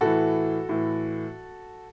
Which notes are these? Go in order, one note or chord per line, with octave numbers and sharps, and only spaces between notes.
A2 E3 F#4 A4
A2 E3